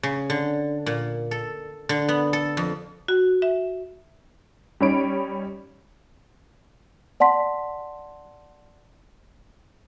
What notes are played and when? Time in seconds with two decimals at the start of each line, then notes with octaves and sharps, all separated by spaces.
0.03 C#3
0.30 D3
0.86 A#2
1.31 A4
1.89 D3
2.08 B3
2.33 A4
2.57 F2
3.08 F#4
3.42 E5
4.80 G3 C#4 D#4 C#5 B5 D7
7.20 D5 F#5 A5 C6 B6